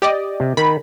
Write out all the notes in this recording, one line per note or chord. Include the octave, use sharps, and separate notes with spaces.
G4 D5 D#5
C3
D#3 B5